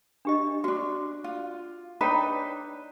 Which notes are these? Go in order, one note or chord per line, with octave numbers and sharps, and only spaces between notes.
D4 G4 D#5
C#4 D4 F#4
F4
D4 D#4 B4 C#5 G5 A#5